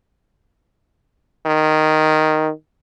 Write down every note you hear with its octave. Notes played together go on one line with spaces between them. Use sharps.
D#3